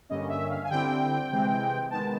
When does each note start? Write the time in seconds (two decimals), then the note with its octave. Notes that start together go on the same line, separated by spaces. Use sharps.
0.09 G2 D3 G3 A#3 C#4 D#5
0.29 E5
0.50 F5
0.64 G#5
0.70 D3 G3 C4 E4 G5
1.31 C3 E3 G#3 C4
1.91 D#3 G#3 B3 A5